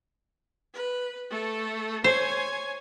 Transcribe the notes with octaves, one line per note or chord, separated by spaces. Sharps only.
B4
A3 A4
C5 C#5 G#5